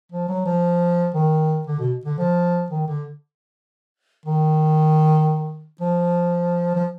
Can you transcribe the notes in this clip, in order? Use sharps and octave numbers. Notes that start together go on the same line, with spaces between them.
F3
F#3
F3
D#3
D3
B2
D3
F3
D#3
D3
D#3
F3
F3